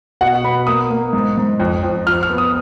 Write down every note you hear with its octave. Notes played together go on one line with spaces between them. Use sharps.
B2 F#5
B3 B5
A#3 D#6
A#3
G#2
G#2
F2
F2
F3 F6
F6
B3
D#6